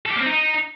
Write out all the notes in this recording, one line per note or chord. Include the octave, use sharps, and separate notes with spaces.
A4
G4
A#3
C4
D#4